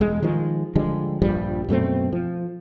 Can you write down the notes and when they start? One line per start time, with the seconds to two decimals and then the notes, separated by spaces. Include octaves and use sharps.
0.01 E1 G#3
0.23 D#3 F3 G#3
0.75 D3 F3 G3 G#3
1.22 A#1 G2 F3 G3
1.68 F#2 B2 A3 C4
2.12 F3